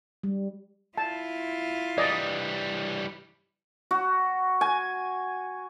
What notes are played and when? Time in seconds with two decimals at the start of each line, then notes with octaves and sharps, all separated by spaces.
0.23 G3
0.98 E4 F4 A5
1.98 E3 G3 D5 D#5
3.91 F#4
4.61 G#5